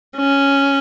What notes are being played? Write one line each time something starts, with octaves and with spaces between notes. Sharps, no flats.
C#4